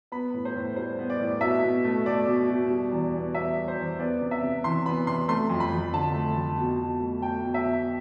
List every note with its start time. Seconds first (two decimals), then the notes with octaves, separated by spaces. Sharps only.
0.12 B3 B5
0.34 A2
0.45 C5
0.55 A2
0.76 G3 C5
0.99 B3
1.10 D5
1.20 A2
1.41 B2 E5
1.64 B2
1.84 A3
2.06 A3 D5
2.27 B2
2.49 B2
2.70 G3
2.92 E2
3.14 B3
3.35 B2 E5
3.57 G3
3.68 C5
3.77 E2
3.99 B3 D5
4.21 C3
4.31 E5
4.43 C3
4.64 E3 C6
4.86 B3 B5
5.07 C3 C6
5.28 A3 C6
5.50 F2
5.60 B5
5.72 F2
5.93 D3 A5
6.14 A3
6.36 F2
6.58 B2
6.79 B2
7.00 A3
7.22 A3 G5
7.44 B2
7.54 E5
7.65 B2